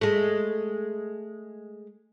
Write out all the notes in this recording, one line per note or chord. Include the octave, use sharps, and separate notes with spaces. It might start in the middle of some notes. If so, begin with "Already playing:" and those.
G#3 A3